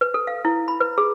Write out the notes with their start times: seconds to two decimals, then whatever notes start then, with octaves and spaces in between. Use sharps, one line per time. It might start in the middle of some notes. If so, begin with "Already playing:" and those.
0.01 B4
0.14 A4
0.27 F5
0.45 E4
0.68 B5
0.80 B4
0.98 G#4